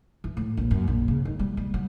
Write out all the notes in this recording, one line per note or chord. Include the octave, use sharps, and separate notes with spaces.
E3
A2
A#1
F#2
A#1
C#3
D#3
G3
G3
F#3